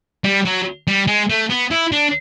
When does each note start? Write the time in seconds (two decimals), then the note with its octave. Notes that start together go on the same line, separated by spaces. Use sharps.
0.24 G3
0.45 F#3
0.88 G3
1.08 G#3
1.30 A3
1.50 B3
1.71 E4
1.92 D4